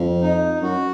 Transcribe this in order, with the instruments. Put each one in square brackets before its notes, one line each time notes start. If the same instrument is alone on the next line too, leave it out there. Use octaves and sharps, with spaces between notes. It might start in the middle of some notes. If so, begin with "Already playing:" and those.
Already playing: [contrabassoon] F2
[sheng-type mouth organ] D#4
[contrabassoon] F#2 [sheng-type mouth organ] F#4